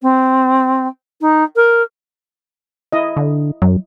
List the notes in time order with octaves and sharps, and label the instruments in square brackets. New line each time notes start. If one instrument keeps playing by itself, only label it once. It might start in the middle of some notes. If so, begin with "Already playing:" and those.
[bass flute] C4
D#4
A#4
[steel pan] E4 D#5
[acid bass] D3
[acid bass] F#2 [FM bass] F#3